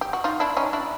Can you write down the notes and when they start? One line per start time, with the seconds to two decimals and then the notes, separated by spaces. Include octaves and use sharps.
0.01 G4
0.13 F#4
0.24 D#4 F4
0.40 D4 E4
0.57 C#4 D#4
0.73 D4 E4